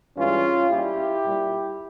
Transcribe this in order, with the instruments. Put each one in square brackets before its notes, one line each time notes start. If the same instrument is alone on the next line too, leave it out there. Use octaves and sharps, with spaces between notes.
[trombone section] G2 E3 G#3 C#4 F4
A#2 G3 E4 G4
A#2 G3